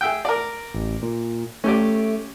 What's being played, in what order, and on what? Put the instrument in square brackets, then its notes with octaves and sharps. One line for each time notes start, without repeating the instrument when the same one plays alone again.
[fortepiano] G#4 E5 G5
A#4 D5
[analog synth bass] A1
A#2
[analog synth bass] A3 [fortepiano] C#4 G4 D5